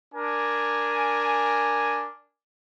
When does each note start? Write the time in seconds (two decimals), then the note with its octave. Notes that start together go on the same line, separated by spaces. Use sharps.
0.13 D4 A#4 G#5